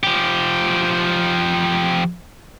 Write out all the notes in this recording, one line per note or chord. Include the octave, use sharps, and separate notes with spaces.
F3 G4